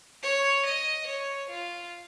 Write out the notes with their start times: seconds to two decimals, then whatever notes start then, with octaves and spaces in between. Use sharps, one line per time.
0.23 C#5
0.65 D#5
1.06 C#5
1.49 F4